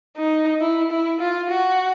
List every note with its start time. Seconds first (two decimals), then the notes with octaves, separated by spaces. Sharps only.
0.17 D#4
0.61 E4
0.91 E4
1.20 F4
1.50 F#4